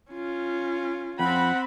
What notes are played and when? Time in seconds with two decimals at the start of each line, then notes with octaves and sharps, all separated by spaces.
0.11 C#4 F4
1.19 F2 C4 F#5 B5